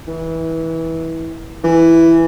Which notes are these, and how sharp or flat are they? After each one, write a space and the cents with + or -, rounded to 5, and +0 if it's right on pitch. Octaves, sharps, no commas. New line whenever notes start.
E3 -20
E3 +5